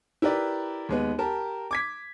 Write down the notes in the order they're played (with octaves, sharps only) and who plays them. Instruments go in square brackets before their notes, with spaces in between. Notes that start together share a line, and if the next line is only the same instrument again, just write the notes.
[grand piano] E4 G4 A#4 B4 D5
D#2 G#3 B3
G4 A#4 A5
D6 G#6 B6